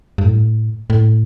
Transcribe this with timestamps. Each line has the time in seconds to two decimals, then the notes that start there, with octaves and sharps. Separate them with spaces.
0.18 G2
0.24 A2
0.90 A2